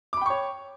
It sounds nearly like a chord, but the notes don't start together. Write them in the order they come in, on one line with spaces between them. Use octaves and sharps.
D6 B5 G5 C#6 C#5